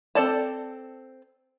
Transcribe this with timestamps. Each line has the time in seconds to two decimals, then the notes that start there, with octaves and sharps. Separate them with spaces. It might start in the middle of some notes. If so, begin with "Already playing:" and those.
0.15 C4 A4 D5 A5